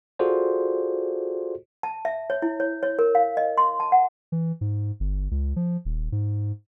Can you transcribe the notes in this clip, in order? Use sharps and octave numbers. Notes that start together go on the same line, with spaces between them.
F4 F#4 G#4 A4 C5 D5
A5
E5
C#5
E4
C#5
C#5
A#4
F5
D#5
C6
A5
F#5
E3
G#2
G1
C#2
F3
D#1
G#2